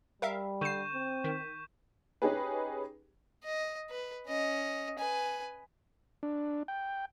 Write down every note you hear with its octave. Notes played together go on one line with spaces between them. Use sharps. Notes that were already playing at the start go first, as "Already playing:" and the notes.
G3 A#4 E5 F5
D3 C#6 G6 C7 E7
C4
D#3 B6
C#4 D#4 G4 G#4 B4
D#5
B4
C#4 D#5
B4 G#5
D4
G5